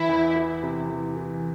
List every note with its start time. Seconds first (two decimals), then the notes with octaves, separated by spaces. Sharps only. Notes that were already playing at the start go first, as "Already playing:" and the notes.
Already playing: E3 E4
0.09 E2
0.36 E3
0.63 C3
0.89 E3
1.17 E3